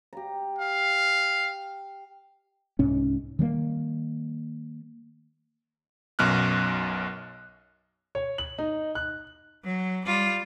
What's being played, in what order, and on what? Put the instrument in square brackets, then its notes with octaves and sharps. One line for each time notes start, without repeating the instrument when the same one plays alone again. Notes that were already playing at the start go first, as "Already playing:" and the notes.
[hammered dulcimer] G4 A#5
[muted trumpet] F5
[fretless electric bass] C2 G#2 C#4
D#3 G3 G#3 A#3
[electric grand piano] B1 F#2 B2 F6 F#6
[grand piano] C#5
F#7
D#4
F#6
[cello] F#3
G3 F4